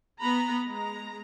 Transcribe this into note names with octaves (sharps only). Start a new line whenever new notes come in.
B3 A#5 B5
G#3 A#5